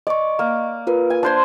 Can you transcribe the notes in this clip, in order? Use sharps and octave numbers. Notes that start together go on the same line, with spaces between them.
D5 D#5 C#6
A#3
F4 A#4 B4
G#5
D4 C5 A5 C6 G#6